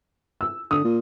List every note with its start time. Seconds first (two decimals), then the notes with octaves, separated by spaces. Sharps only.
0.41 E6
0.71 D3 D#6
0.85 A#2